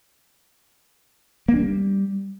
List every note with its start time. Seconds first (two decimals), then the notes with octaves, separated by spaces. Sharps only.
1.48 A#3
1.54 D4
1.59 G3